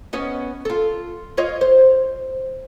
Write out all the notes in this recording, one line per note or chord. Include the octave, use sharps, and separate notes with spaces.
B3 C#4 D#5
F4 A4
F4 C#5 D#5
C5